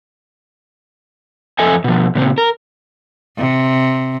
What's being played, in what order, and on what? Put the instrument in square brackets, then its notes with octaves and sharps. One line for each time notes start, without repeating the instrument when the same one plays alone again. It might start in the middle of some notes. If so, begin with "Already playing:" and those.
[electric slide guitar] F2 A4 D#5 E5 G#5
B2 F3
A#2 C#3 C4
A#4
[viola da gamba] C3